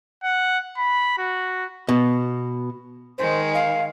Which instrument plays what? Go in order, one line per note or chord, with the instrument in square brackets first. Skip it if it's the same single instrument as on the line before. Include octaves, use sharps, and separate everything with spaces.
[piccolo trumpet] F#5
B5
F#4
[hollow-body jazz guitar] B2
[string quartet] D#3 G#3 [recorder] C5
[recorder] F5